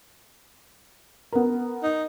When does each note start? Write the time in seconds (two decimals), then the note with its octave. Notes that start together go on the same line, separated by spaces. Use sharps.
1.32 B3 A#4
1.83 D#4